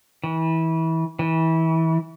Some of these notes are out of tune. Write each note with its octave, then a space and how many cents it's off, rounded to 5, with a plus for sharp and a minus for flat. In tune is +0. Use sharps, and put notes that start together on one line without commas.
E3 -25
E3 -25